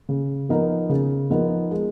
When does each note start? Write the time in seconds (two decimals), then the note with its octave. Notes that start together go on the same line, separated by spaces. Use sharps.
0.09 C#3
0.49 F3 B3 D#4 A#4
0.90 C#3
1.30 F3 B3 D#4 A#4
1.71 G#3